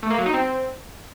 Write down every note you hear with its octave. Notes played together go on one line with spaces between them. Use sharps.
A3
A#3
F#3
D#4
C4